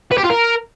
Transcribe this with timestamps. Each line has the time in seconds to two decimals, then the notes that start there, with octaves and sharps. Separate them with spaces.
0.12 B4
0.18 G4
0.24 F4
0.30 A#4